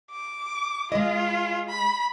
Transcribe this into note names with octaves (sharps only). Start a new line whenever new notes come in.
D6
G#3 F4 D#5
B5